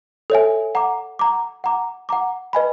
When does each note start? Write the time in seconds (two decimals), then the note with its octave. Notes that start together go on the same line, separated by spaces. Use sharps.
0.30 A4 C#5 E5 G#5
0.75 F#5 A#5 D6
1.19 F#5 A#5 D6
1.64 F#5 A#5 D6
2.09 F#5 A#5 D6
2.53 B4 D#5 G#5 B5